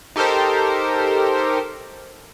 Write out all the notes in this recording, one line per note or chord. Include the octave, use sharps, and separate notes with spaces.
D#4 G4 A4 A#4 C5